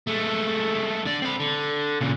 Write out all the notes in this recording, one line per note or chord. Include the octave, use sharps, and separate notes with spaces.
G#3 A3
D3 D5
C4 B5
D3
A#2 C#3